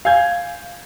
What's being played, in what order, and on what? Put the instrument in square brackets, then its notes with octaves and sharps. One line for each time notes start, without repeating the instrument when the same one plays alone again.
[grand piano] F5 G#5 G6 G#6